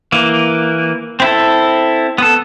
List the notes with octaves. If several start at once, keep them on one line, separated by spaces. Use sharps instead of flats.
E3 A#3
C4 E4 A4
B3 A4